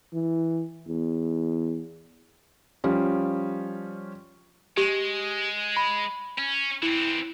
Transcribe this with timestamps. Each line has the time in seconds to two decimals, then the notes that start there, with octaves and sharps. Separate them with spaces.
0.13 E3
0.87 E2
2.84 F3 G3 C#4
4.77 G#3 G4
5.77 B5
6.38 C#4
6.83 E3 C4 E4 C#7